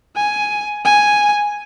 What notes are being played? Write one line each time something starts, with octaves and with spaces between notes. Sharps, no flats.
G#5
G#5